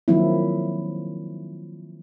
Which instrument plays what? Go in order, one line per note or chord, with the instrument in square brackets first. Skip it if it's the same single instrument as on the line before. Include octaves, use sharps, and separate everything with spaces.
[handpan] D#3 F3 F#3 A#3 C4 E4